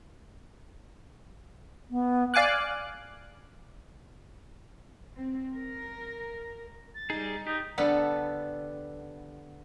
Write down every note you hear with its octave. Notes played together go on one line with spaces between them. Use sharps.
B3
D5 F5 G#5 D6 F#6
C4
A#4
A6
G3 D#4 G#4
D#4 G4
D3 G3 B3 A4